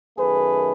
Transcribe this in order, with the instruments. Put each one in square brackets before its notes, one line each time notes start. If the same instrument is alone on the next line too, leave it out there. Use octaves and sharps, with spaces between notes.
[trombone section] F#2 D#3 A3 G#4 B4